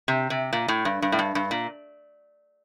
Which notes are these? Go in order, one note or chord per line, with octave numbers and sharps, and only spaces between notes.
C3
C3
A#2
A2
G2
G2
A2
G2
G2
A#2